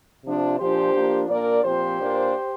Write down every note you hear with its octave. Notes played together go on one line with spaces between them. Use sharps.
C3 F3 D4
A#2 F3 D4 G4 C5
F3 A#3 D4
A#2 A#3 D4 A#4 D5
A#2 F3 C4 G4 C5
A#2 A#3 D4